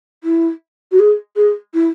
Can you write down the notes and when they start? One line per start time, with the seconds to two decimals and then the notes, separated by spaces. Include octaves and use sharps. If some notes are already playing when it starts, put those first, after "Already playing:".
0.24 E4
0.91 F#4
0.99 G#4
1.36 G#4
1.74 E4